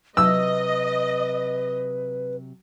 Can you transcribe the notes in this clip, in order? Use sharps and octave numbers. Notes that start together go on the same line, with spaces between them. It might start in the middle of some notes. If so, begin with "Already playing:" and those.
C3 F#3 B4 D#5 E6